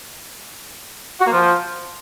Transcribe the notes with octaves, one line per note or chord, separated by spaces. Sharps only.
F#4
A#3
F3